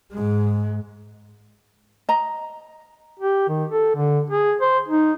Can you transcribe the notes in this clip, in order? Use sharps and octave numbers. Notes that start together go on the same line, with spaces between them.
G#2 G#3
D#5 A#5
G4
D#3
A4
D3
G#4
C5
D#4